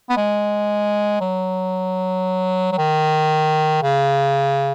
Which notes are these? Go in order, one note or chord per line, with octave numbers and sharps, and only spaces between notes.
B3
G#3
F#3
F#3
D#3
C#3